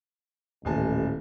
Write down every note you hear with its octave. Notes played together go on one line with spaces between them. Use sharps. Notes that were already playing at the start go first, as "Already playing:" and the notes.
D#1 A1 G#5 A5